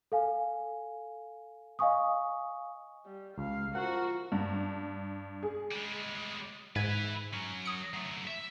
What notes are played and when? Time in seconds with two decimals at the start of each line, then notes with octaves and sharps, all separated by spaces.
0.12 A4 F5 G#5
1.79 D#5 F5 G#5 C#6 D#6
3.05 G3
3.38 C#2 F5
3.75 F3 F#4 A#4 F#5
4.32 G2
5.43 G#4
5.71 G3 G#3
6.76 G#2 B4 E5 G#6
7.33 F#3 C#4
7.65 D#6 C#7
7.94 F#3 A3
8.27 E5